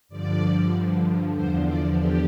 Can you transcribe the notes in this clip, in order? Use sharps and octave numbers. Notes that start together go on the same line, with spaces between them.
G2 D3 F3 D5
E2 D3 F3 C5
D5
G4